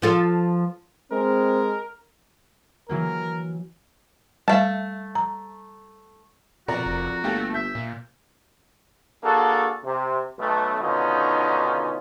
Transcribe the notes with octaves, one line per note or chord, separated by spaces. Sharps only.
F3 F4 A4
G#3 C4 A#4
E3 F#3 A#3 A#4
G3 A3 F5 A5
A#5
F2 B2 F#4 A#4 D5 A#5
F1
G1 A3 A#3 G4 A4
E5 G6
A#2
A#3 D4 F#4 G#4 A4
C3
B1 B2 A3
B2 D3 D#3 C#4 D#4 F4